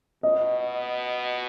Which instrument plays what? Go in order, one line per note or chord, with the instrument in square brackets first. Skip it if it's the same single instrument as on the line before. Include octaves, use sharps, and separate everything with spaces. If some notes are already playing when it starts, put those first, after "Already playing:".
[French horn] B2 [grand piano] D#5